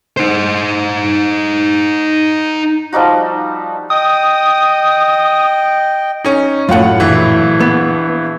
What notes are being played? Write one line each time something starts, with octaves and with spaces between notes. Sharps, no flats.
D#4 C5
F3 G3 D#4 F#4
D#5 G5 D#6
C#4 D#4
F#2 A2 F4 F#5
A#1 E3
B3